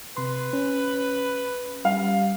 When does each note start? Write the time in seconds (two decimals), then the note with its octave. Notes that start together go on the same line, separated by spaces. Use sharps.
0.17 C3 B4 C6
0.53 C#4
1.85 G3 F5